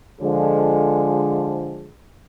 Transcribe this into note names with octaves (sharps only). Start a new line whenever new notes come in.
D3 F3 G#3